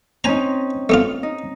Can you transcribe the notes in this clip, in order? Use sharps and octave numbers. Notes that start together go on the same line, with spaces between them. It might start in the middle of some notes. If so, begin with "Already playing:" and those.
C4 C#4 D#4 G#5 A#5
A3 B3 F4
D#4